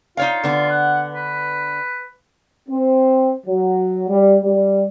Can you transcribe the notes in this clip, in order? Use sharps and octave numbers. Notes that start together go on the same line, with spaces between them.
D#4 F4 C#5 F5
D3 B3
F#5
B4
C4
F#3
G3
G3